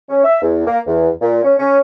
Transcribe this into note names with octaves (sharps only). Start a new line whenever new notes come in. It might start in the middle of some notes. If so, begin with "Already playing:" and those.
C#4
E5
E2
A#3
E2
A#2
C#4
C#4